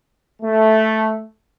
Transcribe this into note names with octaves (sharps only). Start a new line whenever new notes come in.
A3